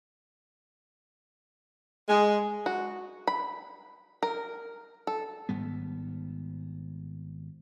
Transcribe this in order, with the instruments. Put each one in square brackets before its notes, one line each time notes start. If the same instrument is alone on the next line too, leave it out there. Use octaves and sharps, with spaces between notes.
[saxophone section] G#3
[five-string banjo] F#4
B5
A#4
A4
[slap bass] G#1 G#2 G3 B3